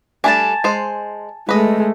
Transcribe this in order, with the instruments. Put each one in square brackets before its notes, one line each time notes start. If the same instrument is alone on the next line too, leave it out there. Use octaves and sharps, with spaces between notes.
[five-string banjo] G3 A3 D4 [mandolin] G#5 A5
[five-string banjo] G#3 C5
[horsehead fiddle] G#3 A3 [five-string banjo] B4 D#5